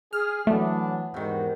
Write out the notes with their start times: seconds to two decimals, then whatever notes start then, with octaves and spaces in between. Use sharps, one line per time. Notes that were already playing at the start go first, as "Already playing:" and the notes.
0.13 G#4 F6
0.47 E3 F#3 A3 B3 D4
1.14 E2 G#2 C3 D#3 F#4